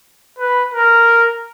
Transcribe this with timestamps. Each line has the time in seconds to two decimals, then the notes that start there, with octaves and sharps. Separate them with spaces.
0.39 B4
0.74 A#4